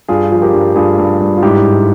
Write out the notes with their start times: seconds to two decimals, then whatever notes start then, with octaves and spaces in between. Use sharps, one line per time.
0.08 G2 F4 G#4
0.31 F3
0.42 G4 A#4
0.53 G2
0.76 G2 F4 G#4
0.98 G2
1.20 G2
1.38 F4
1.42 G#2 E4 G4
1.65 G#2